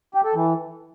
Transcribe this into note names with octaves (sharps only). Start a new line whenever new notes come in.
G4
A4
E3